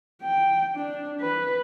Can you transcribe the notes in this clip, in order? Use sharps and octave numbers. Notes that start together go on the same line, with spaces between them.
G5
D4
B4